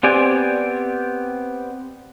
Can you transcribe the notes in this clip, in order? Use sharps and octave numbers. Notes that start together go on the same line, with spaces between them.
B3 C4 G4 D5 G#5